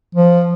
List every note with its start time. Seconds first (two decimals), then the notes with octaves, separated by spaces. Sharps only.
0.15 F3